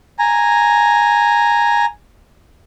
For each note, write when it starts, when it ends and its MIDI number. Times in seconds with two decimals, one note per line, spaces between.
0.19 1.85 80
0.19 1.85 82